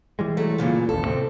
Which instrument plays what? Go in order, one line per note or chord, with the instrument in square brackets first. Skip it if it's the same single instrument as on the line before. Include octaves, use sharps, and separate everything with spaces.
[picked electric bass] E3 G3 G#3
[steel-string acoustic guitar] F#3 A3
G2 A#2 C#3
[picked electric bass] A1 D#2 [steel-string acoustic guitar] A4
[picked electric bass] A2 C3 C4